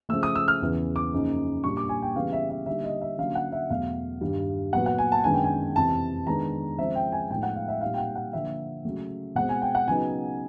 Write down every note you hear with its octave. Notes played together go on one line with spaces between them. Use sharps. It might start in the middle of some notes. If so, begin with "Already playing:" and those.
C#3 F3 A3 E6
D#6
E6
F6
E2 C#3 E3
D6
F#2 C#3 F3 A#3 D#4
A#2 G3 A#3 D4 C#6
D6
G#5
G5
C#3 E3 G3 B3 F5
E5
E5
D3 G3 A#3 D#4 E5
D#5
E5
D3 F#3 A#3 C#4 F5
F#5
E5
E2 B2 F#3 A3 F5
G2 D#3 G3
A#2 F#3 B3 F#5
F#5
G#5
A5
F#2 D#3 G#3 B3 D4 G#5
G5
G#5
F2 C3 E3 A5
D#3 G#3 B3 D4 A#5
C#3 F3 G#3 C4 E5
G5
G#5
A2 F3 G#3 B3 D#4 G5
F#5
F5
E5
A#2 G3 C4 D#4 F5
G5
F#5
F#5
D3 F3 A#3 E5
C#3 F#3 A3
B2 G#3 C4 F#5
G#5
G5
F#5
C#3 F#3 B3 D#4 G#5